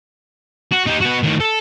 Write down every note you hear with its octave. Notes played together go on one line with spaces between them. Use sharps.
F#4
D#4 G4
B3 F#4
A2 D#3
A4